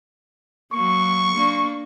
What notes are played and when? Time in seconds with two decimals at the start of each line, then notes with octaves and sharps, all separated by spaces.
0.72 F#3 A#3 C#6
1.34 A#3 D4